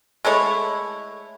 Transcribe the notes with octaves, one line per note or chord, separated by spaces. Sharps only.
G#3 A3 E4 C#5